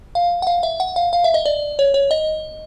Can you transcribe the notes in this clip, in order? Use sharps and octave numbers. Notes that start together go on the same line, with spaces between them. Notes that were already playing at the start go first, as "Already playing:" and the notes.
F5
F#5
F5
E5
F#5
F5
F5
E5
D#5
D5
C#5
C#5
D#5